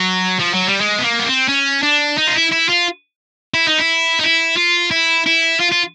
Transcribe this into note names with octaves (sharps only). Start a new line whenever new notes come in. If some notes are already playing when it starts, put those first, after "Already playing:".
Already playing: F#3
F3
F#3
G3
G#3
B3
A#3
B3
C4
C#4
D4
D#4
F4
E4
E4
F4
E4
D#4
E4
D#4
E4
F4
E4
E4
F4
F4